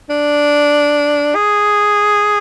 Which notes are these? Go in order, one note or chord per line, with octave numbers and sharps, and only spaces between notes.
D4
G#4